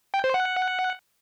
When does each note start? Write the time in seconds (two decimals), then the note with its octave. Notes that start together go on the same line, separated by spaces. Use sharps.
0.14 G5
0.24 C5
0.34 F#5